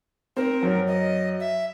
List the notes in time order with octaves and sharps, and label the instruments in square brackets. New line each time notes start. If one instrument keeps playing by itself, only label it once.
[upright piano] C4 [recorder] A#4
[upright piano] F#2
[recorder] D#5
E5